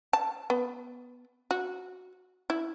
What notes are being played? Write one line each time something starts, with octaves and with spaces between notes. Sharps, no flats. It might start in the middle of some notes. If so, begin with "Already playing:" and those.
A5
B3
F#4
E4